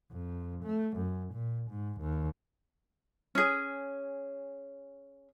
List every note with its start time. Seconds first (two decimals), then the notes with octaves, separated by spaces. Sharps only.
0.12 F2
0.64 A3
0.97 F#2
1.33 A#2
1.70 G#2
2.01 D#2
3.35 C#4 G#4